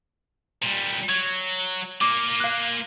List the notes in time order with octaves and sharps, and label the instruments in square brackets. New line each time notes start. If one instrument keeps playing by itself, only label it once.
[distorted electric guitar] A#2 G3
[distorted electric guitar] F#3 [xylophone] G#6
[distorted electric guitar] A#3 F4 [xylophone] D6
[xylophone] F5 F#6